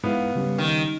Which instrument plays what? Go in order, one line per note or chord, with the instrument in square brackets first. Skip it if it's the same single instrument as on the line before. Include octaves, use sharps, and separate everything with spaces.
[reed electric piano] G#2 E4 [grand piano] B3 F5
[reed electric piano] C#3 G3 C#4
[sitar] D#3